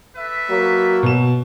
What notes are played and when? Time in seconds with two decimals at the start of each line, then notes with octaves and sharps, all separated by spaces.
0.16 A4 B4 E5
0.50 F#3 A#3
1.03 B2 E7